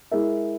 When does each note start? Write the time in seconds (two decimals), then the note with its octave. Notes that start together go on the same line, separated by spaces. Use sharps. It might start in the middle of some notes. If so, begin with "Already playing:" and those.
0.11 G#3 E4 A#4 E5